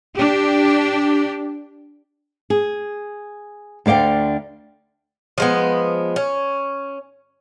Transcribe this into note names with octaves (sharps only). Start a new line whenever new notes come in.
D4 G4
G#4
D2 D3 D5 F5 G5
F3 G#3 B3
C#4